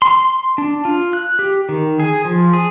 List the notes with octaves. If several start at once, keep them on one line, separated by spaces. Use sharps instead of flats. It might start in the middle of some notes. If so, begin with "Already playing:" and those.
C6
D4
F4
F#6
G4
D#3
G#4
F3
G#4